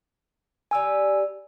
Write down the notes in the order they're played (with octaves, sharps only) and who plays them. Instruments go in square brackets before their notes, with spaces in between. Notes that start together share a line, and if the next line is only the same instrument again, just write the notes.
[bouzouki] G3 G4 A4 [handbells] G#5 E6